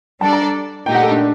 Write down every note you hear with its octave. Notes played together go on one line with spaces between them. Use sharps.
G3 D4 A4 D5 A5
A#5
A#2 A3 D#4 G4 G5
F#5
A4
D4